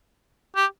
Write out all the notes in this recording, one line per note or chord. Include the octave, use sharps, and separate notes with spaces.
G4